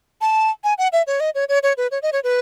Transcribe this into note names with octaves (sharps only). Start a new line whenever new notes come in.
A5
G#5
F#5
E5
C#5
D#5
C#5
C#5
C#5
B4
C#5
D#5
C#5
B4